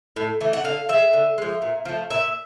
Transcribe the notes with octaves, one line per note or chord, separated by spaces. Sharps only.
A2
E3 A3
F#5
D3 F5
F3 G#3 E5
D3
F3 G#3
A#2
F3 A3
A#2 E5